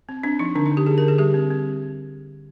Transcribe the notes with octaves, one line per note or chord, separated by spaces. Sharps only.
C4
C4 D4
F3 D#4
D3 D4
D#4
D3
G4
D3 G#4
A#4
D3
G#4
G3 G4
C4
C4